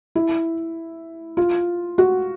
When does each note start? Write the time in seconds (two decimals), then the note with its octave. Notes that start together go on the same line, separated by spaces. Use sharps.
0.15 E4
1.37 F4
1.98 F#4